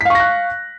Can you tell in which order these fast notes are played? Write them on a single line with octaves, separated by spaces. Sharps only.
B6 F5 C#6 A#6 F#6